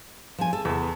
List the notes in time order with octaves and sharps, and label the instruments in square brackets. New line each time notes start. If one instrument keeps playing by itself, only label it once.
[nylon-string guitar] F3 G#5
A4
[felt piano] E2 [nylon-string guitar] A4